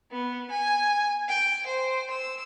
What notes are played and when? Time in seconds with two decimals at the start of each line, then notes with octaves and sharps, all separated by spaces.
0.11 B3
0.51 G#5
1.28 G5
1.66 C5
2.10 E6